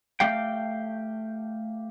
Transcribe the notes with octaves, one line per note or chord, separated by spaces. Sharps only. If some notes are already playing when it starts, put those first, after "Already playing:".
A3 G4 F5 G5